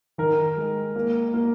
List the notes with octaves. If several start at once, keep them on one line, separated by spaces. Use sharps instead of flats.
D#3 A#4
G#3
A#3
A#3